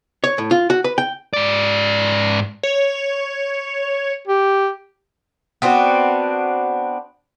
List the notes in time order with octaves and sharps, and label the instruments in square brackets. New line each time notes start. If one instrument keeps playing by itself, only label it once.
[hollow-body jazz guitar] C#5
A2
F4
F#4
B4
G5
[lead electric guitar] G#2 D5
[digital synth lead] C#5
[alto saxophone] G4
[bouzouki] B3 C4 D4 F#4